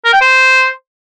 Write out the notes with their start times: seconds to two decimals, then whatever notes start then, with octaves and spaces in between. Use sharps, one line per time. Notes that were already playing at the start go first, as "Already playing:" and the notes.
0.05 A#4
0.13 G5
0.21 C5